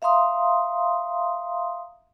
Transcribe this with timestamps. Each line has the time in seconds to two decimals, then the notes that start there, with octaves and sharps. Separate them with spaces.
0.02 E5 F5 A#5 C6 D#6